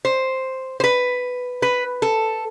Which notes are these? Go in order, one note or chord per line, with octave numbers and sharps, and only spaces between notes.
C5
C5
B4
B4
A4